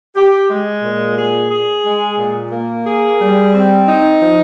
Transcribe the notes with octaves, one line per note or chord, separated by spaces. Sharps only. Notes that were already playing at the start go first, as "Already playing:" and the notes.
G4
G#3
A#2
G#4
G#4
G#3
A#2
A#3
G#4
G3
C4
D#4
F3